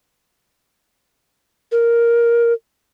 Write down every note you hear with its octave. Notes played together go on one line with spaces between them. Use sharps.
A#4